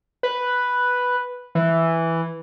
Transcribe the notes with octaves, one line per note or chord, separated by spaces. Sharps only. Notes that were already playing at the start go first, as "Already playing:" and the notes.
B4
E3